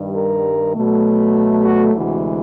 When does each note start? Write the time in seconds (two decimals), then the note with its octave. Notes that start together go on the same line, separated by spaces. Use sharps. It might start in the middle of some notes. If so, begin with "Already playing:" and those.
Already playing: G2 D#3 G3
0.16 A#4
0.76 B2 F#3 A3
1.65 F#4
1.94 D2 C3 E3 G#3 F#4